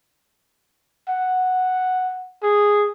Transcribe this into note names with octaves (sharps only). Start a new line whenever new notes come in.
F#5
G#4